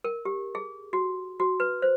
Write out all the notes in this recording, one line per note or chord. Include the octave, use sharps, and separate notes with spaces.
A#4
G4
G#4
F#4
F#4
B4
C5